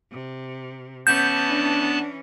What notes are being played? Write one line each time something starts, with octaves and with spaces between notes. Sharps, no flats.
C3
E3 B3 C#4 A5 G6
D4